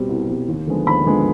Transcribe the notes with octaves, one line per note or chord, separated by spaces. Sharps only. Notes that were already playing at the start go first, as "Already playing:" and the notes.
Already playing: B2 G3 C4
C2
B2 G3 C4
D#2
D3 F3 G#3 B3
D#2 B5
D3 F3 G#3 B3